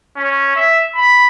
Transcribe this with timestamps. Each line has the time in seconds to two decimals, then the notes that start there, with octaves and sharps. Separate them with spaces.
0.16 C#4
0.56 E5
0.96 B5